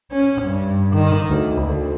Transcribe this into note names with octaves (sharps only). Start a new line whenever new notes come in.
C#4
G2
D#3
D2
D2